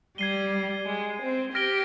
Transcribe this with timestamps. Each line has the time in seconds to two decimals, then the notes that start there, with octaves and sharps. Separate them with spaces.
0.18 G3 G#6 C7 D#7 G7
0.87 G#3
1.21 C4
1.54 G4 F6 A#6 D7 G7